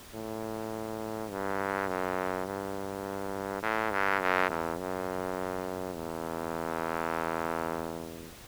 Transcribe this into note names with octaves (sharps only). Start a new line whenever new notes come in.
A2
G2
F#2
G2
A2
G2
F#2
E2
F#2
E2